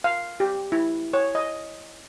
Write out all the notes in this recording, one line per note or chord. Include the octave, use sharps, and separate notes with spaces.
F5
G4
E4
C#5
D#5